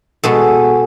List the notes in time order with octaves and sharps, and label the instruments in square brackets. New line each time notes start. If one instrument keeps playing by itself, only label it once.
[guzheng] B2 G#3 B3 A4